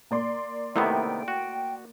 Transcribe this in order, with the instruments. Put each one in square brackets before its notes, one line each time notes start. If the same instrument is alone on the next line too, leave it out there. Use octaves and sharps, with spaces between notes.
[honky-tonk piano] A#3 D5 C6
[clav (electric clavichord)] C3 D#3 B3 [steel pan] A3 E4 [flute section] G5
[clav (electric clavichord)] F#4